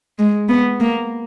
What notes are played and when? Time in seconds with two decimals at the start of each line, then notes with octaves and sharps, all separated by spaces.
0.19 G#3
0.49 B3
0.80 A#3